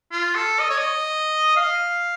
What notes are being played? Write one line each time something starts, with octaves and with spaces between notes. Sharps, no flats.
F4
A4
D#5
C#5
D#5
F5